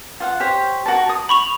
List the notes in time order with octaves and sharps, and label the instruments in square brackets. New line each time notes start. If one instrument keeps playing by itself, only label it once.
[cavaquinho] F4 F5 F#5
G4 C5 C#5
F#4 A#4 A5
D#6
[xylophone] B5 C#6 F7